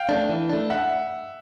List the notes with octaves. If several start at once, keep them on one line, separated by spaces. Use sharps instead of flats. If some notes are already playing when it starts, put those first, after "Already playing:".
Already playing: F5 G5
A3 D4
E3
A3 D4
E5 F#5